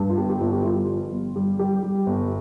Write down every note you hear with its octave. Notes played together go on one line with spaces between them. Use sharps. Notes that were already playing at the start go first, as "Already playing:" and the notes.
Already playing: G2
F4
G1 G4
G4
G1 F4
G4
G1 F4
F3
G1
G3
G3 G4
G3
G1